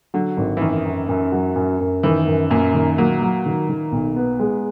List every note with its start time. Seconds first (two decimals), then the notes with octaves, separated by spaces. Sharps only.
0.14 D3 F#3
0.37 G#1
0.57 E3
0.62 F#2 D#3
0.85 F#2
1.09 F#2
1.32 F#3
1.56 F#2
1.80 F#2
2.03 D#3 E3
2.27 F#2
2.50 F#2 A#2
2.74 D#3
2.98 A#2 F#3
3.22 F#3
3.46 D#3
3.69 D#3
3.92 B1
4.16 B3
4.39 G#3